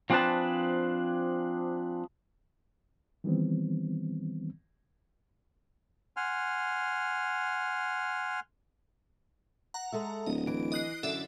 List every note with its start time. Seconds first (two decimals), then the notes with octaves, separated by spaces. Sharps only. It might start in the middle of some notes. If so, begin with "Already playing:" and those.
0.10 F3 C4 D4 G#4 B4 A5
3.24 D#3 E3 G3 B3 C4
6.17 F#5 G#5 C6 F6
9.74 F#5 A#5
9.92 G#3 A4 E5
10.26 D1 D#5
10.47 E3 D7
10.72 D#5 F#6 C7
11.03 F#2 D3 A4 D5 E5